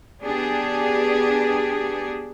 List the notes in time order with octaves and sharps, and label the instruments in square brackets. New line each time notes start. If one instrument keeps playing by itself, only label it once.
[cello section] B3 D4 G4 G#4